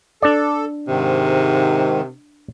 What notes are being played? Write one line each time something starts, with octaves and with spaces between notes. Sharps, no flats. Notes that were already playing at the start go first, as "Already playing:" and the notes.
D4 A4 D5
G#2 C3 D#3